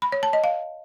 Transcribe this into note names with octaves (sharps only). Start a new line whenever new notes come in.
B5
C#5
A5
D#5
F5